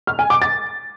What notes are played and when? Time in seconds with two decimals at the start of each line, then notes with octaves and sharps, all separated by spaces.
0.07 F6
0.19 G#5
0.30 D6
0.42 A6